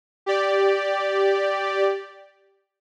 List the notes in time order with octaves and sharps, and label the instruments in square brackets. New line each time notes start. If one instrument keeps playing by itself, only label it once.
[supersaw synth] G4 D5